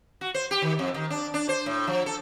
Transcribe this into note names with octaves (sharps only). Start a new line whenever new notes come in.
F#4
C5
G4
D#3
F2
D#3
D4
D4
C5
A2
F3
A4